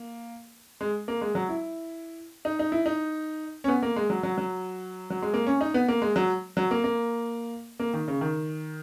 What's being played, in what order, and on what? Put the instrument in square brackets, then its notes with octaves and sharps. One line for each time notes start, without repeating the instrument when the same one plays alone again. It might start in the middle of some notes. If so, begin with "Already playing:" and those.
Already playing: [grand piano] A#3
G#3
A#3
G#3
F#3
E4
D#4
D#4
E4
D#4
C#4
B3
A#3
G#3
F#3
F#3
F#3
F#3
G#3
A#3
C#4
D#4
B3
A#3
G#3
F#3
F#3
A#3
A#3
A#3
D#3
C#3
D#3